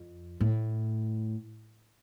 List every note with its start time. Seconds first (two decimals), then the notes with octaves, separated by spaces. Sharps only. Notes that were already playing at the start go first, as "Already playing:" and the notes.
Already playing: F2
0.40 A2